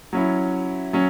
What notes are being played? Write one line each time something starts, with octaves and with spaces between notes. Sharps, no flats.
F#3 C#4 E4
F#3 C#4